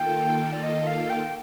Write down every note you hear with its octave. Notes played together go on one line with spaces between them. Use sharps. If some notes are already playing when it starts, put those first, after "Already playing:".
Already playing: D#3 A#3 F4 A4 G5
D5
D#5
F5
G5